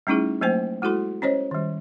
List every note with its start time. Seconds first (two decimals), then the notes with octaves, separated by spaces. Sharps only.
0.07 G3 A3 C#4 D#4 E4 G#4
0.41 F#3 A3 A#3 C5 G#5
0.82 G#3 E4 F#4 A4 C6
1.22 C#4 C5 C#5 D#5
1.51 D#3 G3